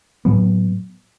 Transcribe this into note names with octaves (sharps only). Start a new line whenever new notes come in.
A2 F#3 B3